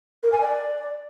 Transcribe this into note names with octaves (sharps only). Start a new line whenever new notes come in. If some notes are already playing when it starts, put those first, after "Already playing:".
A#4
G#5
D5